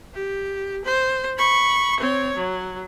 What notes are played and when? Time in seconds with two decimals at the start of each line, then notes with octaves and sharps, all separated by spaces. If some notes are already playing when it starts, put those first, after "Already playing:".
0.14 G4
0.85 C5
1.38 B5 C#6
2.00 C4 C#5
2.37 F#3